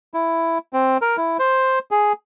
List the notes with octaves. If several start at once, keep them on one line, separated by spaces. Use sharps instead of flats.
E4
C4
A#4
E4
C5
G#4